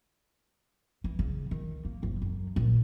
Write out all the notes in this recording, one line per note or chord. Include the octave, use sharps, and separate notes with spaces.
E3
C#3
D#3
A#3
F#1
F#2
A#1